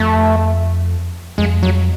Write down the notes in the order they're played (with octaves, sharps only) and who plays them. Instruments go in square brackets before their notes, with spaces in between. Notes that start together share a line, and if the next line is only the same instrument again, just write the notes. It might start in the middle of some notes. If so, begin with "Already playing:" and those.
Already playing: [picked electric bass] F2 [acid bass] A3
[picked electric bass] F2 [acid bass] G#3
[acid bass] F#3